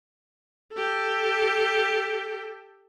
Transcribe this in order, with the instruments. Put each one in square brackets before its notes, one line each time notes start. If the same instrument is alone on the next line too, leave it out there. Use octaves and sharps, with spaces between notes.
[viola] G4 A4